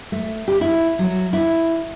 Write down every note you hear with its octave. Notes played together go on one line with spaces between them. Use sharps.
A3
G4
E4
F#3
E4